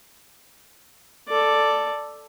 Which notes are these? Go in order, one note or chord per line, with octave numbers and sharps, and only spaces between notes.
A4 D5